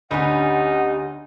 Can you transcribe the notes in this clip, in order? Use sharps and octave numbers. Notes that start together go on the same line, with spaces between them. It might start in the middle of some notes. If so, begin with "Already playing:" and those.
D2 G3 B3 C#4 D#4 F#5